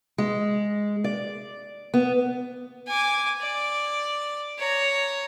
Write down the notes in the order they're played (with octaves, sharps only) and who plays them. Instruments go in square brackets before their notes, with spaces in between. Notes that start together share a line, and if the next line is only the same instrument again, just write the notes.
[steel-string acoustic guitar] G#3
D5
B3
[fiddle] G#5 D6
D5
C#5 A#5